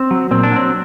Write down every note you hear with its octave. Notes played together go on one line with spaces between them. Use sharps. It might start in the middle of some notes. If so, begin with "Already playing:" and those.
Already playing: C4
F#3
A#2 C4
D4
F#3 C4